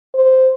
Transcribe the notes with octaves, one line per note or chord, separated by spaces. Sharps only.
C5